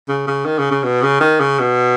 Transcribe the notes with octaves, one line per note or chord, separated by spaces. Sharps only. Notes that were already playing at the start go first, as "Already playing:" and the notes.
C#3
C#3
D#3
C#3
C#3
B2
C#3
D#3
C#3
B2